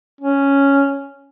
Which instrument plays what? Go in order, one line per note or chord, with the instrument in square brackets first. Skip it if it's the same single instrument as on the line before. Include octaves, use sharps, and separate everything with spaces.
[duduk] C#4